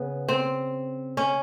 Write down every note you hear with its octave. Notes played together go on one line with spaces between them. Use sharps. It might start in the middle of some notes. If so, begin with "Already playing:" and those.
Already playing: C#3 B3
C4
C#4